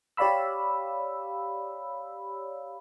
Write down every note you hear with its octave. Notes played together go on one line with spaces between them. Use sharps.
G4 C#5 D5 F5 B5 E6